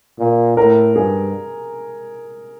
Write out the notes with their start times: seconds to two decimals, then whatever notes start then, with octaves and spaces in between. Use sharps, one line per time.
0.19 A#2
0.57 A2 A#4
0.96 G2 G#4